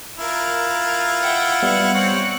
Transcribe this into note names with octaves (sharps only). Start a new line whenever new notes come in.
E4 F4 A#4
E5 F#5 G5
G3 B3 F#5 F#6 C#7
C4 C#5